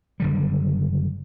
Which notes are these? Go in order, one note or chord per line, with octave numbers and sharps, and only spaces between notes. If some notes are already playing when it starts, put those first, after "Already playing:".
F#1 D3 G3